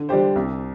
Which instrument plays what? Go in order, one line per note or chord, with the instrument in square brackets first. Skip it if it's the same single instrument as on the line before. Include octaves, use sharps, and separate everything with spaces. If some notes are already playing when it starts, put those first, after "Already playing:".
Already playing: [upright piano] D3
G3 D4 G4 C5
C2